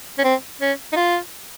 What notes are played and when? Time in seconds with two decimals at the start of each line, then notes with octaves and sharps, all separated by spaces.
0.18 C#4
0.24 C4
0.61 C#4
0.93 D#4
0.96 F4